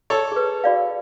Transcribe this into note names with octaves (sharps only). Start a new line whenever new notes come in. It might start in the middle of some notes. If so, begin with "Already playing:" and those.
A4 C#5
G#4 B4
F#4 D5 F5